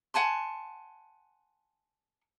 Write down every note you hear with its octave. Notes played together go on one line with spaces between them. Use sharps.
F#5 G#5 A5 C6